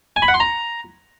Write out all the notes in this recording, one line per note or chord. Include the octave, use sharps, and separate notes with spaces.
G#5
B5
F#5
C6
A#5